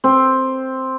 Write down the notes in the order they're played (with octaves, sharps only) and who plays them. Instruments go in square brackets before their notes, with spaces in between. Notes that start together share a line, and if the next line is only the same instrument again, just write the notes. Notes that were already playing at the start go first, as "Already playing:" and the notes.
[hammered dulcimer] C4